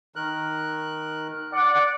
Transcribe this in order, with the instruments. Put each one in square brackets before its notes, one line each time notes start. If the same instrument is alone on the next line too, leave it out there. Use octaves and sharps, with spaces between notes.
[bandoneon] D#3 A#4 F#6
[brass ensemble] D5 F#5